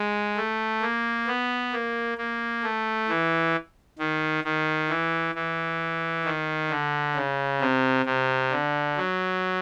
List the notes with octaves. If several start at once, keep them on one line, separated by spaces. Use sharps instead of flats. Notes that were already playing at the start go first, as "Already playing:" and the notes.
Already playing: G#3
A3
A#3
B3
A#3
A#3
A3
E3
D#3
D#3
E3
E3
D#3
D3
C#3
C3
C3
D3
F#3